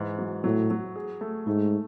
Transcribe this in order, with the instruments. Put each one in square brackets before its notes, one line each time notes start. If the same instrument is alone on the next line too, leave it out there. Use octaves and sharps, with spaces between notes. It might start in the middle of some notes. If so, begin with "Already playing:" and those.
Already playing: [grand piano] G#2 E3
F#3
[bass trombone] A2 [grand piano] F#3
[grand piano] F#3
G#4
A3
[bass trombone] G#2 [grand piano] A3